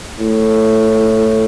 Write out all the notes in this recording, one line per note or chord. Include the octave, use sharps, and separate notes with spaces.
A2